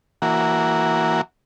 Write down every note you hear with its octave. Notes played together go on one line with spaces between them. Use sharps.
E3 A#3 F#4